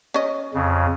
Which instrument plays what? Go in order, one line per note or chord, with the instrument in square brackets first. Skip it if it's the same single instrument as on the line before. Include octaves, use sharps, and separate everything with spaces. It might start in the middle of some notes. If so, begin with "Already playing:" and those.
[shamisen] C#4 D#5
[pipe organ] F2 C#3